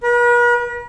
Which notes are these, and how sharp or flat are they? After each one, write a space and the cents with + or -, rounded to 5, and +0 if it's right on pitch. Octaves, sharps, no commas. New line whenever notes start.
B4 -45